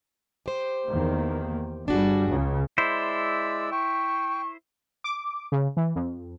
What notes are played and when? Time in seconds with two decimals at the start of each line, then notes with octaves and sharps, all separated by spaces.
0.46 G4 C5
0.88 E2 D#3 A#3
1.88 G1 G3 D4 F#4 G#4
2.29 C#2 C#3
2.78 G#3 E4 C5 D5 E6
3.72 G5 C#6
5.04 D6
5.52 C#3
5.77 E3
5.96 F2